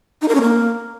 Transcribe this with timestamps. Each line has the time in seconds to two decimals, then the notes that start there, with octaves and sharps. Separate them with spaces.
0.22 D#4
0.28 A#4
0.35 C#4
0.41 A#3